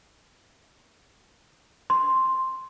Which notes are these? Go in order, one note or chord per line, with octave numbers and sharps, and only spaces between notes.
C6